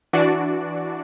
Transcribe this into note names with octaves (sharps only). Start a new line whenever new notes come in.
E3 D4 F#4 D5